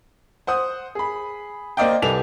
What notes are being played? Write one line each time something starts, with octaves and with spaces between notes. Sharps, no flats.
C5 F#5 D#6
G#4 B5
A#3 C5 D5 D#5 F5 G5
C2 G4 A4 B4 G#5 F7